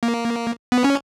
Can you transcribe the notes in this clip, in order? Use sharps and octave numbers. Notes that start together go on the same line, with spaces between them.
A#3
B3
C#4